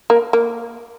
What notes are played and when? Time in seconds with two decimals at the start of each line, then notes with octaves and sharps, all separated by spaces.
0.10 A#3
0.33 A#3